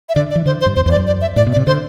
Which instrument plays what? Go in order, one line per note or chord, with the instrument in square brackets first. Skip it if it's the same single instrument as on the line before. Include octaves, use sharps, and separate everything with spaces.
[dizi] E5
[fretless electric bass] D3 [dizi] D5
[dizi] D5
[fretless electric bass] E3
[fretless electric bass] D3 [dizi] C5
[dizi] C5
[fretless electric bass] G2
[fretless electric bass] E2 [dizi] C5
[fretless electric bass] E2 [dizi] C5
[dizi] D5
[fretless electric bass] F#2
[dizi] D5
E5
[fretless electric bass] A2 [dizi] D5
[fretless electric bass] B2
[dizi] D5
[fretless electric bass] C3
[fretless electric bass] D3 [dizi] C5